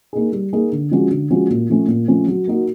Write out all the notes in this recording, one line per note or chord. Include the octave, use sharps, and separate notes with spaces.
A#3 D#4 G#4
G3
A#3 D#4 G#4
D3
F3 G#3 C#4 F#4
D3
F3 G#3 C#4 F#4
A#2
F3 A3 C#4
A#2
F3 A3 C#4
F#3
A#3 D#4 F#4